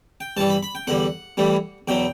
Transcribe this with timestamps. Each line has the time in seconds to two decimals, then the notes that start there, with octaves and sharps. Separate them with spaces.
0.21 G5
0.37 G2 E3 G3 A5
0.50 B5
0.63 B5
0.75 G5
0.87 E2 D3 G3 F#5
1.37 A2 E3 G3
1.88 E2 B2 F#3 G5